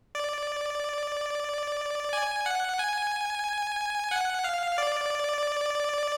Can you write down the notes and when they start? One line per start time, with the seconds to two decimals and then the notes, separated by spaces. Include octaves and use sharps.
0.15 D5
2.13 G#5
2.46 F#5
2.79 G#5
4.11 F#5
4.44 F5
4.78 D5